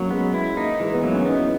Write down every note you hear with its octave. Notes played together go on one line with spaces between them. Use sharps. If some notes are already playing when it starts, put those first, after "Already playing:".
Already playing: F#3 A#3 C#4
G#3 B3
E4
A#3 D#4
E3 G#3
B3
F#3 A#3
B3
C#4
B3 D#4
E4